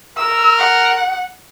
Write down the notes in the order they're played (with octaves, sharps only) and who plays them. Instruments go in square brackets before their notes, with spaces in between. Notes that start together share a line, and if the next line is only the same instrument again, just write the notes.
[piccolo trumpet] A#4 [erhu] E6
[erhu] F#5